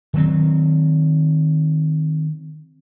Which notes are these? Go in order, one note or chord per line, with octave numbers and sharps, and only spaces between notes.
D#3 F#3 C4